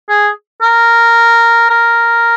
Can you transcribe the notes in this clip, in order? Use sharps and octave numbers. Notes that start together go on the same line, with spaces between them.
G#4
A#4
A#4